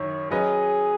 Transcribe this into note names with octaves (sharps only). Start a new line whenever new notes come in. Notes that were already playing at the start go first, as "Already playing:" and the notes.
Already playing: F#2 D#3 C#5
F#3 C#4 G#4 B4 D#5